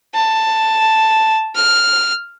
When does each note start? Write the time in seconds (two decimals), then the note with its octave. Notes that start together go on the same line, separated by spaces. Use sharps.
0.14 A5
1.55 F6